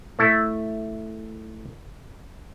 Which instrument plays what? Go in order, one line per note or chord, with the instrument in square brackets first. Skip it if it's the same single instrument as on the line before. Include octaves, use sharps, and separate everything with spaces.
[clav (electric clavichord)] A3 E4 A4